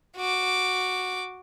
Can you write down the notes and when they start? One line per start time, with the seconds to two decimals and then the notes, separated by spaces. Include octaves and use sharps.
0.17 F#4 D6